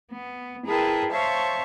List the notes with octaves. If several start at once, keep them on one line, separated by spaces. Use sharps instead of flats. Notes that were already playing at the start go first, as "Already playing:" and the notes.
B3
E4 G#4 A#4 B4 G5 A5
C5 C#5 E5 F5 A5 C#6